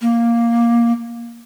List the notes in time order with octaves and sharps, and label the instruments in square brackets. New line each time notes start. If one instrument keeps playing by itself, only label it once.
[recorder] A#3